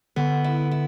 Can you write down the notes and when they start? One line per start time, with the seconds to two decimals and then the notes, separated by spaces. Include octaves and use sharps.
0.16 D3 B3
0.44 E4
0.71 E4